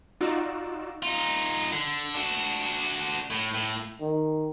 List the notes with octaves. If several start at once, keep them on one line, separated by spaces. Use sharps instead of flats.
D#4 F4 F#4 D5 E6
D#4 F4
D3
D4 F#4
A2
A2
D#3